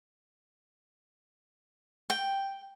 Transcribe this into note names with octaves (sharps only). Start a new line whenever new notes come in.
G5